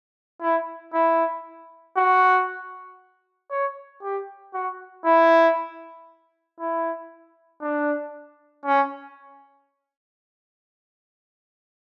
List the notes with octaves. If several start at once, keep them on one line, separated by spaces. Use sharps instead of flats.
E4
E4
F#4
C#5
G4
F#4
E4
E4
D4
C#4